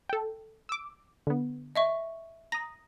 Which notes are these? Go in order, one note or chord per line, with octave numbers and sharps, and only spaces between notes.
A4 G5
D6 E6
D3 B3
D#5 E5 C#6
A#5 D#6 A#6